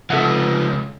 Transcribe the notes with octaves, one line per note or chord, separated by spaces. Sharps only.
C#2 C3 F3 A4 E5 F#5